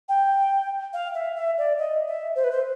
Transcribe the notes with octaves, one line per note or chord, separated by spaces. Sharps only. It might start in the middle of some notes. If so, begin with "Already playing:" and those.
G5
F5
E5
E5
D5
D#5
E5
C5
B4
C5